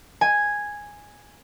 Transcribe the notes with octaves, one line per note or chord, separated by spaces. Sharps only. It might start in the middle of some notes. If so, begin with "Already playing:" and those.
G#5